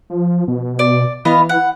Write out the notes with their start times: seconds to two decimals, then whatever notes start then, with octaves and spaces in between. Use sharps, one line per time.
0.10 F3
0.48 B2
0.79 D5
1.25 E3 B3 D#5 F5
1.49 F#5